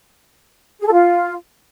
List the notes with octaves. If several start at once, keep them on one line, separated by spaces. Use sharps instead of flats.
G#4
A4
F4